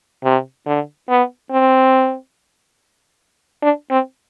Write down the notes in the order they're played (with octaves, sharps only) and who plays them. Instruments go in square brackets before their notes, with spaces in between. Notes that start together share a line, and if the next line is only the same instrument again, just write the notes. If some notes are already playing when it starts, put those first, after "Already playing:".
[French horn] C3
D3
B3
C4
D4
C4